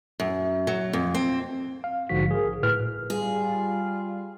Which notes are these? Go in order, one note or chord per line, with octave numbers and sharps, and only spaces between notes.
F#2
F#3
F2
C4
F5
A#1 G#2 D3 F3 F#4 B6
G#4 A#4
A2 B4 F6
G3 F4 G#4